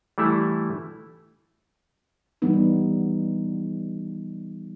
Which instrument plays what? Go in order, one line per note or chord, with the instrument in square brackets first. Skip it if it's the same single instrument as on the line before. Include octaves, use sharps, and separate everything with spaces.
[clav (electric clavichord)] E3 G3 A3 E4
[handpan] E3 G3 B3 D#4